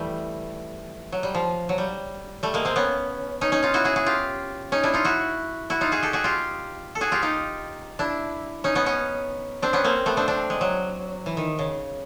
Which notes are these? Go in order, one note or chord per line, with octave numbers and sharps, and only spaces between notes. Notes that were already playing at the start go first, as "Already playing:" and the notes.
Already playing: E3 G3 A3
F#3
G3
F3
F#3
G3
G3 A3
G#3 A#3
A#3 C4
B3 C#4
C#4 D#4
C#4 D#4
D#4 F4
E4 F#4
F#4 G#4
F#4 G#4
F4 G4
C#4 D#4
D4 E4
D#4 F4
E4 F#4
E4 F#4
D#4 F4
F#4 G#4
G4 A4
F#4 G#4
F4 G4
A4
F#4 G#4
F4 G4
D#4 F4
D4 E4
C#4 D#4
B3 C#4
B3 C#4
C4 D4
B3 C#4
A#3 C4
A3 B3
C4 D4
C4 D4
G#3
F#3
E3
D#3
C#3